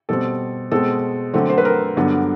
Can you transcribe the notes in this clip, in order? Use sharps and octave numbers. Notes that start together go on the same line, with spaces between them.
B2 G3 C4 A4
B2 G#3 C4 A4
D3 F#3 A3 C4
C5
B4
A#4
G2 D3 F#3 B3